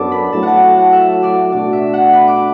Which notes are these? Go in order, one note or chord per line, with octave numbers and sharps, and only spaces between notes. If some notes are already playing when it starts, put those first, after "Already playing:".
Already playing: F#2 F#3 B3 D4 A4 A5 D6
B5
A2 F#3 A3 F#4 A5
F#5 A5
A5
F#5
E5
D5
B2 A3 D4 F#4 D5
E5
F#5
B5
D6